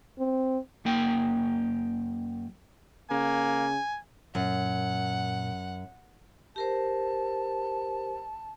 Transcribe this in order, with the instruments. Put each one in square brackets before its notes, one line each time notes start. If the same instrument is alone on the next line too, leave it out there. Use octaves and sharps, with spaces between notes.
[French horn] C4
[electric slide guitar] F#2 A#3 G5
[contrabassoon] C#3 [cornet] A#3 [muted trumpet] G#5
[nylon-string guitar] F#2 [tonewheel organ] A#2 [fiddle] F#5
[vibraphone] G4 A#4 C5 [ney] A5